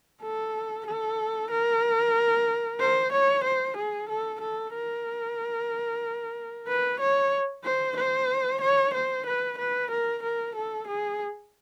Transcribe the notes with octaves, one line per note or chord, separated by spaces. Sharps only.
A4
A4
A#4
C5
C#5
C5
G#4
A4
A4
A#4
B4
C#5
C5
C5
C#5
C5
B4
B4
A#4
A#4
A4
G#4